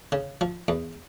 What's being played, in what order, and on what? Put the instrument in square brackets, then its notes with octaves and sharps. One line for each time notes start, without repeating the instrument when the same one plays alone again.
[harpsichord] C#3
F3
E2